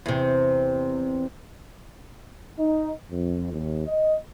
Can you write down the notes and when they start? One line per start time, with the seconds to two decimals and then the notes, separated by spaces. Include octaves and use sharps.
0.06 E2 C3
2.59 D#4
3.11 F2
3.53 D#2
3.87 D#5